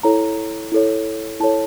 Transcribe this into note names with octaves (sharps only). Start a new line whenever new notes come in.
E4 A4 C#5 A#5
E4 A4 C#5
E4 A4 C#5 A5